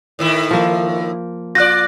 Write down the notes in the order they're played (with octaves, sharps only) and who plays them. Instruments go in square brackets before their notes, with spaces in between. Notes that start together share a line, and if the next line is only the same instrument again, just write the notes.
[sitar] A2 D#3 E4
[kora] F3 A#3
[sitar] F4 D5 [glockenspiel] F#6 A#6